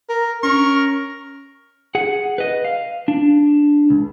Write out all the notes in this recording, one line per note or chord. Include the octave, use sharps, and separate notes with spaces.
A#4
C#4 A#4 C#6
G#4 F#5
B4 D#5
F5
D4
C#2